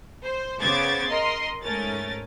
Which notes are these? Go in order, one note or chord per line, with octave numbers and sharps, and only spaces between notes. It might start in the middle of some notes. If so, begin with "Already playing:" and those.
C5
C#3 B3 C5 D6 G#6 A6
A#4 D#5 C6
G#2 A3 C#4 A#4 A6